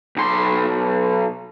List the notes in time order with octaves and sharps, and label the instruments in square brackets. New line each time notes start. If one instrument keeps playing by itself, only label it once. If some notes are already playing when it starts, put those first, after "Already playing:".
[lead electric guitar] B1 C6